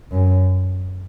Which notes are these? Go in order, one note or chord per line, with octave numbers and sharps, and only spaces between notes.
F#2